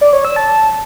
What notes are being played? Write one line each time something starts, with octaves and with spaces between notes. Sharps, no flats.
D5
C#5
E6
A5